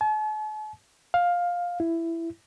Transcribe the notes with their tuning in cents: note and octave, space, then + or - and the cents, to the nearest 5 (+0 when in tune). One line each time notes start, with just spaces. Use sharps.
A5 -45
F5 +15
E4 +10